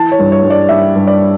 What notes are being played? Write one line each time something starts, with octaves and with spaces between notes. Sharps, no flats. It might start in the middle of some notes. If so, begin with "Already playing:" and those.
Already playing: E3 A5
C#5
G2
C#5
G2
D5
G3 E5
G2
D5